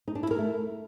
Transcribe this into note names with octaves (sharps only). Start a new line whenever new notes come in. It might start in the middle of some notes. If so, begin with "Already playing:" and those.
D#4
D4
E4
A#4
A3